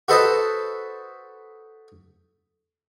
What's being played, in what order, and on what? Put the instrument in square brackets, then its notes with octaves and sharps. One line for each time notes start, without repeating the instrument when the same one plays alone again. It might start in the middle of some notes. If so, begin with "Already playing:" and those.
[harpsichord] F#4 A4 B4 C5 D#5 A5